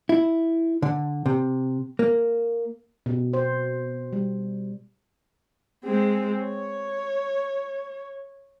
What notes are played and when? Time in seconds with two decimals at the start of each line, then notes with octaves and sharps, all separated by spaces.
0.09 E4
0.82 D3
1.26 C3
1.99 A#3
3.06 B2
3.33 C5
4.13 G3
5.84 G#3 C4
6.42 C#5